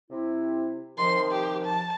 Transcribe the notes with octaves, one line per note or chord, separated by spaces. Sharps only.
C3 E4
C3 D#3 F3 C6
G4
A5